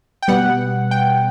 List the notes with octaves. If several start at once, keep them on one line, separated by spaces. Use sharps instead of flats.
G5
B2 G3 B3 F#5
G5